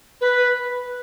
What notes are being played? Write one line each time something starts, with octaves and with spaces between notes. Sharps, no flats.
B4